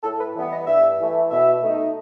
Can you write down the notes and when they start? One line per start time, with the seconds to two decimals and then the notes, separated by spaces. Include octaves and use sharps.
0.03 A2 A4
0.19 B4
0.35 E3 G3 B3
0.51 D#5
0.67 G2 E5
0.99 E3 A3
1.31 B2 E5
1.63 A3 D#4